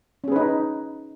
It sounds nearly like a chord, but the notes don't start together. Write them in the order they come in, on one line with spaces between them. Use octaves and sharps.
C#4 G#4 B4 D#4